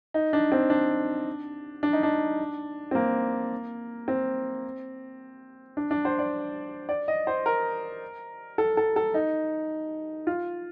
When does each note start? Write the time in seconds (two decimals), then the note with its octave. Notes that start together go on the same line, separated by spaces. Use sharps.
0.14 D#4
0.33 D4
0.52 C4
0.70 D4
1.83 D4
1.93 D#4
2.03 D4
2.91 C4
2.95 A#3
4.08 C4
5.77 D4
5.91 D4
6.05 C5
6.19 D5
6.89 D5
7.08 D#5
7.27 C5
7.46 A#4
8.58 A4
8.77 A4
8.96 A4
9.14 D#4
10.27 F4